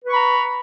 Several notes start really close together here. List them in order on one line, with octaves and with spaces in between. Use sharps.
B4 C#6 B5 A#5